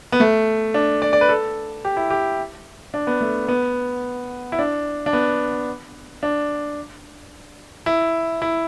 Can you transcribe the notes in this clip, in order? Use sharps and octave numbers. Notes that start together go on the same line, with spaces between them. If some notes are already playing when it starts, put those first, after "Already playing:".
B3
A3
D4
D5
D5
B4
A4
G4
E4
G4
D4
B3
A3
B3
E4
D4
D4
B3
D4
E4
E4